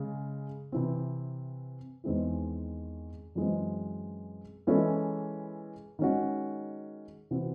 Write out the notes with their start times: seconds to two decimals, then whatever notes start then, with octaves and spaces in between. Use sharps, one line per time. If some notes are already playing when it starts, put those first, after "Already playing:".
Already playing: C#3 G#3
0.72 C3 E3 C4
2.04 E2 D#3 G#3 C4 E4
3.35 F#2 E3 G#3 C4
4.67 E3 G#3 C#4 E4 A4
5.99 D#3 G#3 C#4 F#4
7.31 C3 E3 C4 F#4